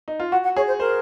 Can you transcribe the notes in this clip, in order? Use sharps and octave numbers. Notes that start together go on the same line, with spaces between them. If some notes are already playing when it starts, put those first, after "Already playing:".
D#4
F4
F#4 F#5
F#5
G#4 C#5
C5
A#4 C5